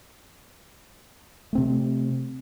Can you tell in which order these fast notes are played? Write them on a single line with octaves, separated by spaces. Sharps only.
A3 C4 C3